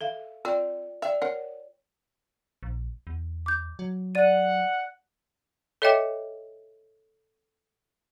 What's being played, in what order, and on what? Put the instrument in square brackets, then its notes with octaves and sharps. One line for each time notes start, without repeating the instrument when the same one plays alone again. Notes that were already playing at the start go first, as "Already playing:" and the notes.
[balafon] A4 E5 F5
[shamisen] C4 [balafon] F4 D5 G5
[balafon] D5 G5 [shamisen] E5
[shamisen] A#4 F#5 [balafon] C#5
[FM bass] A#1
E2
[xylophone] D6 G6
[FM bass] F#3
[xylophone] D5 D#7 [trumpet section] F#5
[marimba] A4 C#5 D#5 E5 G5 D6